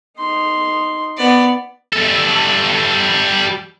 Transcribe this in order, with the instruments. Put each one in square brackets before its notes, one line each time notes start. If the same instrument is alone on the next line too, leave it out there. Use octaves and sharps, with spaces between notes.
[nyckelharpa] D#4 C6
[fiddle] B3 D5
[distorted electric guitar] G3 A4